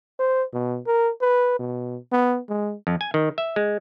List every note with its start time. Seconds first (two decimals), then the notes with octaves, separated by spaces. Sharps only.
0.19 C5
0.54 B2
0.87 A#4
1.21 B4
1.59 B2
2.12 B3
2.49 G#3
2.87 F2
3.01 G#5
3.14 D#3
3.38 E5
3.56 G#3